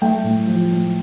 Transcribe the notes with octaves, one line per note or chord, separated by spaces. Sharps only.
A3 G5
A2
F3
A2